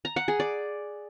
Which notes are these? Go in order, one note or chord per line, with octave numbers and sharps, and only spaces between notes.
A#5
F#5
G#4
D5